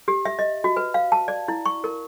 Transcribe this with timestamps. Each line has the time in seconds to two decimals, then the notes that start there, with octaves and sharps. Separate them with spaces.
0.08 G4
0.25 E5
0.39 D#5
0.64 F#4
0.77 B4
0.94 F5
1.12 A5
1.28 D5
1.48 E4
1.66 C#6
1.84 A#4